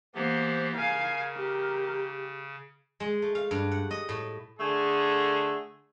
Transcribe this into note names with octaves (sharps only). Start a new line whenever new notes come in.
E3 A#3 B3 G4 C5
C#3 A#4 F5 G#5
G4
G#3
A3
F5
G2
F#5
D#5
A2
D3 A3 G#4